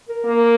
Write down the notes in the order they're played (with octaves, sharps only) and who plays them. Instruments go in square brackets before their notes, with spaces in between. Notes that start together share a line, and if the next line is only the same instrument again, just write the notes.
[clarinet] A#4
[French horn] A#3